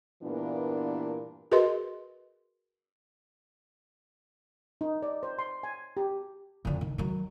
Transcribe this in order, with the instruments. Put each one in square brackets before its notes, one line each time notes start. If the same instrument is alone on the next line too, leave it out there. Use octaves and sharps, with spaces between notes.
[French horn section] G2 A#2 E3 A#3 B3 D4
[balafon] F#4 G#4 A#4 B4 D#5 C6
[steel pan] D#4
D5
C5
C6
G#5
G4
[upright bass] F2 D3
D#3
D#3 F#3